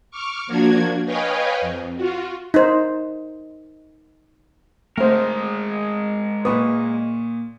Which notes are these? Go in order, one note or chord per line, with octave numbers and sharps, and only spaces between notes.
C#6 D6 F6
F3 A#3 D4 F#4 G#6
B4 C#5 D#5 F5 G5 G#5
F2
F4 F#4
D#4 C5
G#3 A3 A#4 C5
A#2 B4 C#6 D#6